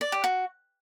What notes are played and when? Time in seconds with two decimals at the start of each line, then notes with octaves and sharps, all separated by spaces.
0.01 D5
0.12 G4
0.24 F#4